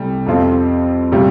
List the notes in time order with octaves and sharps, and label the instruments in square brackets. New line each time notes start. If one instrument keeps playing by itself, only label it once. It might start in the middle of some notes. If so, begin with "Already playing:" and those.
Already playing: [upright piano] C2 C3 A3 [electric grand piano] G3
[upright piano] F2 F3 C4 F4 A4
[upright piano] C3 A3 F4 A4 [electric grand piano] G3